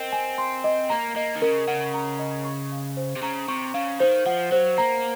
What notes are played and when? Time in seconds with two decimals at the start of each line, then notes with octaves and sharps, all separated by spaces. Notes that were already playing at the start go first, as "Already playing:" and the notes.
Already playing: C4 A#4 D#5
0.12 G#5
0.38 C6
0.64 D#5
0.90 A#3 A#5
1.16 A#3 D#5
1.36 D#3
1.42 C#3 A#4
1.68 C#3 F#5
1.94 A#5
2.19 D#5
2.45 C#6
2.72 F5
2.97 C5
3.16 C3
3.22 C#3 A#5
3.48 C3 C#6
3.74 C#3 F5
4.00 D#3 C5
4.26 F3 F#5
4.52 F#3 C5
4.78 A#3 A#5